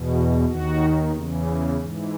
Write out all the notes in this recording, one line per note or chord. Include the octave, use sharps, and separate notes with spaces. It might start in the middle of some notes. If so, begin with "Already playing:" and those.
Already playing: E2 B2
F#4
D#2 D#3 F#4
E2 C#3 E3
G#2 E3